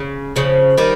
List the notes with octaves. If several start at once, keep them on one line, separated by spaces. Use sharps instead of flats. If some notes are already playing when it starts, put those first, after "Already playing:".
Already playing: C#3
C#3 F3
D#3 G3